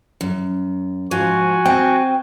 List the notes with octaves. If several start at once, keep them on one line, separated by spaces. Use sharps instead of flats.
F#2
G#2 F3 F4 F#4 G#5
C4 G5